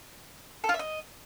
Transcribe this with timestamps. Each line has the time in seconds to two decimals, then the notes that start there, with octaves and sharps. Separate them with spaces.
0.64 A4
0.69 F4
0.74 E5
0.79 D#5